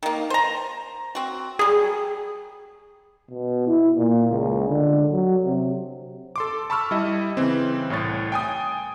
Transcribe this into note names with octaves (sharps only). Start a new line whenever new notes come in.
D#3 A#3
C5 A#5
C4 F#4
F#3 G3 G#4
B2
E4
A#2
C#2
D3
F#3
C3
A4 C6 D6
A5 B5 C#6 E6 F6
G3 E4 D#5
C#3 E3 C4
C2 A2 C#5 A6
G5 G#5 D#6